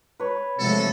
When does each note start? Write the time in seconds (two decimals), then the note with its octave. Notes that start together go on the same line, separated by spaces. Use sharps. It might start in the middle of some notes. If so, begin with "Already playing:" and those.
0.20 B4 C#5
0.59 C3 F3 F#3 G#3 A3 A4